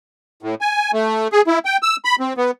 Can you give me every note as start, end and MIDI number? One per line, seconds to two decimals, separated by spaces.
0.43 0.55 45
0.61 0.91 80
0.93 1.28 57
1.32 1.42 68
1.47 1.59 64
1.65 1.77 79
1.83 1.96 88
2.05 2.16 83
2.20 2.33 60
2.37 2.51 59